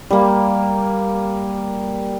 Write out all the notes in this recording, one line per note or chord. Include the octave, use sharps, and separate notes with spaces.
G3 A#3